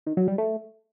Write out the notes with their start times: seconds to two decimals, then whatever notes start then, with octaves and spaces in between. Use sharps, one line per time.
0.06 D#3
0.17 F#3
0.28 G3
0.38 A3